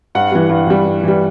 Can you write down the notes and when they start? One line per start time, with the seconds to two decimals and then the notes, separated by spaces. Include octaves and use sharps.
0.15 G2 F#5
0.32 E3 G3
0.49 G2
0.67 E3 G3
0.85 G2
1.03 E3 G3